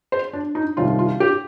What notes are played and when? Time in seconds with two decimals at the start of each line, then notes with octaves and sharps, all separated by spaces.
0.12 C5
0.33 D4
0.55 D#4
0.77 C2 C3 D#3 F4
0.99 F4
1.20 G4